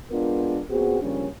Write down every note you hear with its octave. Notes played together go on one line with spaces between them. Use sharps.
G#3 B3 D4 F4 A#4
A#2 B3 C4 F#4 G#4
C#3 F3 G3 A#3 C#4 D4